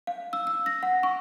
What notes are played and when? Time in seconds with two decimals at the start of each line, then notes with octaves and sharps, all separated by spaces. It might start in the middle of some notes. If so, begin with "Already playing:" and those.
0.07 F5
0.33 E6
0.47 E6
0.66 A#6
0.83 F#5
1.03 C#6